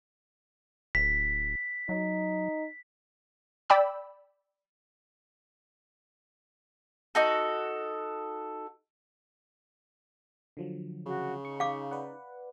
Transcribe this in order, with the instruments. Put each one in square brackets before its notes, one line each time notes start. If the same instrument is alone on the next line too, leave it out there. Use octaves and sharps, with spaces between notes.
[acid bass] D1 [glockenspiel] B6
[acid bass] F#3 [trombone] D#4
[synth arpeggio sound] D5 G5 B5 E6
[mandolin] D#4 F#4 A4
[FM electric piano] D3 F3 F#3
[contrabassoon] C#3 [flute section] F#4
[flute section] D#4 [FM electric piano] C#6
[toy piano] F5 D6
[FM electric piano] B4 D5 F#5